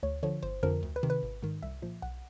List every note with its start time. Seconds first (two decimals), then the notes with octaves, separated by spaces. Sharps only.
0.03 D2 C#5
0.23 D3 F3 C#5
0.43 G1 C5
0.63 F2 D3 F3 A#4
0.83 D2
0.96 B4
1.03 C3 D#3
1.10 B4
1.23 G#1
1.42 G#2 D#3
1.63 C2 E5
1.82 A#2 F3
2.02 B1 F#5